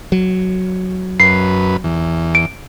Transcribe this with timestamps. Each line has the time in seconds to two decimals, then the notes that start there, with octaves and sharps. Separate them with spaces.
0.12 F#3
1.20 F#2 B4 C7
1.84 E2
2.35 D7